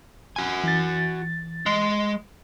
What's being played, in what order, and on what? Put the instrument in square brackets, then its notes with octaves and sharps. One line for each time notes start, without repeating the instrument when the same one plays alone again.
[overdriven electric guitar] F#4 G#5
[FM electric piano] E3 A6
[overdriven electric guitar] G#3